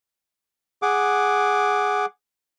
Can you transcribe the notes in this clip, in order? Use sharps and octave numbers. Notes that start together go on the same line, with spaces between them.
G#4 F#5 D6